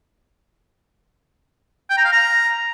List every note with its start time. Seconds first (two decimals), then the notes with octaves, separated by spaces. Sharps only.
1.90 G5
1.97 A#5
2.05 F5
2.12 A#5